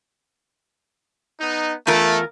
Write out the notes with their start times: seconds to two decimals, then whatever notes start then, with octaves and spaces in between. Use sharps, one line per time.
1.41 B3 D#4
1.87 E2 A3 F4 A#4